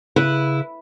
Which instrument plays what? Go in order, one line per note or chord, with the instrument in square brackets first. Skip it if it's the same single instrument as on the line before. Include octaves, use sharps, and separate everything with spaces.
[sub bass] C#3 [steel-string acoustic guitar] E4 [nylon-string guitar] B4